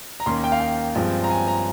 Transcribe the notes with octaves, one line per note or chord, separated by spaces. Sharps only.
A#5
D#2 D#3 A#3 C#4 C6
G5
F5
G5
G2 F3 G#3 C4
A#5
G#5
A#5